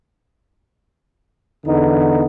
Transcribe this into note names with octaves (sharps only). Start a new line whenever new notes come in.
E2 D3 B3 D#4